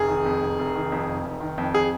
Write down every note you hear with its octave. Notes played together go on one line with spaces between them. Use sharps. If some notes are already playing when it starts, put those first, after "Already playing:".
Already playing: F1 G#4
D#3
F2
F1
F1
D#3
F2
F1
F1
D#3
F2
G#4